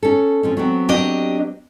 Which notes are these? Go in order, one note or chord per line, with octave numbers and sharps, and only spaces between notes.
C#4 A4
F3 C4 C#4
F#3 B3 C4
D4 G4 D#5